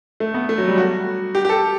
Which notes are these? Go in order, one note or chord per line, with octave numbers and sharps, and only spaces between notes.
A3
B3
A3
F#3
G3
F#4
G4
G4
A4